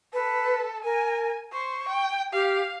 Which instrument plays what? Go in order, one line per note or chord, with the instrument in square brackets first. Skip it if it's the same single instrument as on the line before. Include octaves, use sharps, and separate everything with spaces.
[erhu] A4 [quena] B4
[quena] A#4 [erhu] G#5
[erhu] C5 [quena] C#6
[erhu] G5
[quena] G4 [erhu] F5